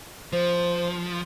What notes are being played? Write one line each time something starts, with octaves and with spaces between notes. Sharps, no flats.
F3 C5